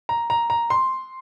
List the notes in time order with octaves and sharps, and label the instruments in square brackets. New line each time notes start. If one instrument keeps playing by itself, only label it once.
[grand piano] A#5
A#5
A#5
C6